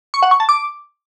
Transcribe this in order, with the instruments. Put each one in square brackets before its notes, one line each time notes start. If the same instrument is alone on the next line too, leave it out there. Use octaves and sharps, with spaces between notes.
[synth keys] C#6
F#5
C#6
A5
D6